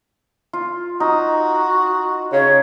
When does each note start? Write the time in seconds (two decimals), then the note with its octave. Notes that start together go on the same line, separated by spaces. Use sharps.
0.53 F4
1.00 D#4 F#4
2.32 C#3 C#5